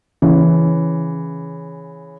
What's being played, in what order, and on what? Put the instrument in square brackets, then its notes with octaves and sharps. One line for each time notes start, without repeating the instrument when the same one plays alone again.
[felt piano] C#3 E3